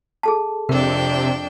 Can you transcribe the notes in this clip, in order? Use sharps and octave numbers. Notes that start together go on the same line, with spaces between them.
G#4 A4 A5
F2 C3 D4 A#4 G5